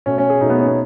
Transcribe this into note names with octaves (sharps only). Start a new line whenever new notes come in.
B2 A3 C#4
C#4
G#4
B2 A3 D#4
B3
C#4
B3